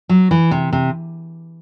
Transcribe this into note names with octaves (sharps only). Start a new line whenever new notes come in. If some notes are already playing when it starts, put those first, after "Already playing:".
F#3
E3
C3
C3